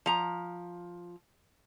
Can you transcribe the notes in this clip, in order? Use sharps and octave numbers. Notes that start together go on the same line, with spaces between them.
F3 A#5